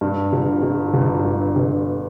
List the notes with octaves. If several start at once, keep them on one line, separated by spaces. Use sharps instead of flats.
G2
G1
G1
G1
G2
G1